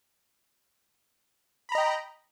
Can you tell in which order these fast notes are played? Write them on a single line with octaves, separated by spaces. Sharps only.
B5 A#5 D#5 G5